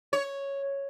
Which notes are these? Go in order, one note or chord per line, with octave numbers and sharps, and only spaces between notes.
C#5